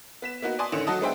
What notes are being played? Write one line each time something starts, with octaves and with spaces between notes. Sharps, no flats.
B3 B6 E7
A#3 B3 D#4 F#4
D5 G#5 A5 C6 D#6
A1 D3 D#3 C#4 C#7 E7
F#3 F#4 A4 D#5 A5 D#6
G#3 B3 D4 C5 E5 G5